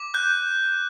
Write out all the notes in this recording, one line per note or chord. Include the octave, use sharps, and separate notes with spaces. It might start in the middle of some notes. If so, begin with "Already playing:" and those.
Already playing: D6
F#6 G6